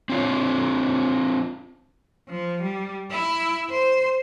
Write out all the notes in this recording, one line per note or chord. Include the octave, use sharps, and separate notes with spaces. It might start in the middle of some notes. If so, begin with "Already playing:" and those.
C4 D4 F4 C#5
F3
G3
E4
C5